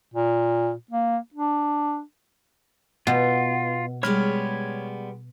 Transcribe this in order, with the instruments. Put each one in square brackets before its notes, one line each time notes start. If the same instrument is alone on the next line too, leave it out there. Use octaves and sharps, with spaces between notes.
[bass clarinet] A#2
A#3
D4
[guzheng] B2 [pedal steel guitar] F4
[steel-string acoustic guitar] G3 G#3 B3 [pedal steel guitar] C#5 B5 F6